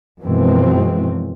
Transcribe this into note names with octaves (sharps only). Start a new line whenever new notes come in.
F#2 B2 E3 F3 G#3 C4